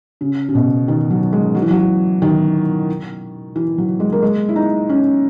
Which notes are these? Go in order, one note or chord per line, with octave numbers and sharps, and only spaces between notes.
C#3
C#3
B2
D#3
F#3
G#3
F#3
E3
F#3
D#3
E3
F#3
G#3
A#3
G#3
E4
D#4
C#4